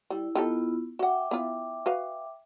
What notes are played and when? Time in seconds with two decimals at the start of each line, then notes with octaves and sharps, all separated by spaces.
0.10 G3 E4
0.35 D#3 B3 E4 F4 G4 A4
0.99 F#4 E5 F#5 G5 D6
1.31 B3 E4 F4
1.86 F#4 B4 F5